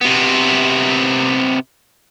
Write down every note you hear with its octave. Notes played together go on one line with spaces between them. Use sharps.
C3 B3